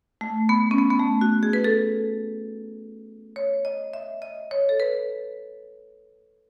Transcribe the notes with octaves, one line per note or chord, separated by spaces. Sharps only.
A3
B3
C#4
B3
B3
A3
F#4
G#4
B4
A4
C#5
D#5
E5
D#5
C#5
A4
B4